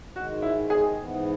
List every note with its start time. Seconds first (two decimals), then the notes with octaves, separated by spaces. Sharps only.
0.15 G#2 D#3 G#3 F#4
0.42 E4
0.70 G#4
0.97 G#2 E3 B3